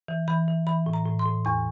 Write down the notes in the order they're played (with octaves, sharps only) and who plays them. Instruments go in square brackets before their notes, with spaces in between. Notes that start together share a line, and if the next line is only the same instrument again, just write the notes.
[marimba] E3
E3 B5
E3
E3 B5
A2
A#5
A2
C6
A2
E2 C#6